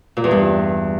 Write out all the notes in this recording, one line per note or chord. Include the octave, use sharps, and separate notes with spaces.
A#2
E2
G2